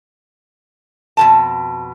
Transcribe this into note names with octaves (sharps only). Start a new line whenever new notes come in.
F2 B2 A5